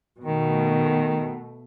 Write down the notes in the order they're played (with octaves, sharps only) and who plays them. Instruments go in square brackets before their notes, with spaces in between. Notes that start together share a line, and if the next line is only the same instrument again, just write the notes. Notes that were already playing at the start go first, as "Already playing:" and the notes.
[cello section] B2 A3 [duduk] D#3